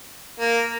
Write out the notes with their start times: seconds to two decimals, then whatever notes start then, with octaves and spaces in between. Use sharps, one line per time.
0.40 A#3